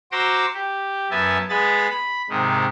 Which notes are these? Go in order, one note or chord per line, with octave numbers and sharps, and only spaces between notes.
F#4 C5 A#5 C6 D6 E6
G4
F#2 B3 E5 G#5 A5
G#3 B3 G#4 B5 A6
B5
G#2 C3 D#3 G#3